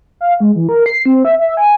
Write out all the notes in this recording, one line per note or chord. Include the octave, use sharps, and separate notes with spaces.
F5
G#3
E3
A#4
C7
C4
E5
E5
G#5